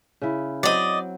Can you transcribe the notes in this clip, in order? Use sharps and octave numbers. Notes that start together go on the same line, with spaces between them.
C#3 E4
F#3 C4 C5 D5 D#5